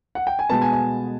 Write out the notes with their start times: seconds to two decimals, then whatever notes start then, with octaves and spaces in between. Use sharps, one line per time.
0.15 F#5
0.27 G5
0.39 G#5
0.50 B2 G#3 B3 A5
0.62 G#5
0.73 G#5